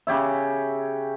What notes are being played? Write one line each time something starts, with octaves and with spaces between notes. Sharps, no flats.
C#3 G4 C#5 E5